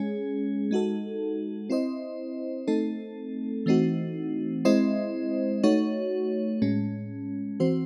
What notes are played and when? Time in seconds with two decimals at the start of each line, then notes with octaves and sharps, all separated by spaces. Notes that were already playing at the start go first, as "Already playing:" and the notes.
Already playing: G#3 C#4 G#4
0.71 G#3 D#4 F#4 A4
1.70 C4 E4 C5 D#5
2.67 A3 C4 D#4 A4
3.66 E3 A3 C4 D#4 F#4
4.65 G#3 C4 E4 C5 D#5
5.63 A3 D#4 F#4 C#5
6.62 A2 G#3 C#4
7.60 E3 C4 F#4 C5